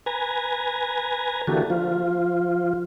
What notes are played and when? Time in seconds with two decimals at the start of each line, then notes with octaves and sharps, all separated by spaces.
0.06 B4 G#5 A#5
1.47 D3 E3 A#3 F#4 G4 A4
1.70 F3 F4